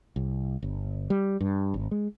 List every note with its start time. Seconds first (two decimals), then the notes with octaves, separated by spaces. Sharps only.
0.16 C2
0.62 G1
1.10 G3
1.41 G2
1.74 G#1
1.91 G#3